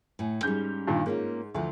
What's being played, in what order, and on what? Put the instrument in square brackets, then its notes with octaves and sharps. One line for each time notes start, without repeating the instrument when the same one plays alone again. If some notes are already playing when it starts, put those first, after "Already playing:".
[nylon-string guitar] A2 F#5 G#5
[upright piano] G#2 G6 [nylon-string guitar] G3 C#4
[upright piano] G2 A#2 D#3
[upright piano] G#2 [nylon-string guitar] A#3 C#4 F4
[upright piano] D2 [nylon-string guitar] E3 F3